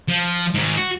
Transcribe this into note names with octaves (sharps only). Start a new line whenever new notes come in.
F3
G#2 D#3
F#4